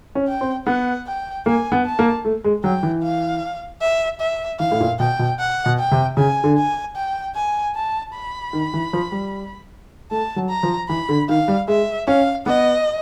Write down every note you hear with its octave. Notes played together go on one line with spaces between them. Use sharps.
C#4
G5
C4
B3 F#5
G5
A#3 G#5
B3
A5
A#3
A3
G#3
F#3 G5
E3
F5
E5
E5
E3 F5
A2
A#2
B2 G5
B2
F#5
B2
G5
C3
C#3 G#5
D3
G#5
G5
G#5
A5
B5
D#3
E3
F3
G3
A3 A5
F#3
A#5
F3
E3 B5
D3
D#3 F5
G3
G#3 E5
C#4 F5
B3 D#5